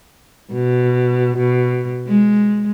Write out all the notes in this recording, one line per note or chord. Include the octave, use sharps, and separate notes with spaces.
B2
B2
G#3